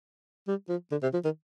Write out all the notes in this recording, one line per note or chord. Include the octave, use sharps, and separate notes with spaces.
G3
F3
D3
C3
F3
D#3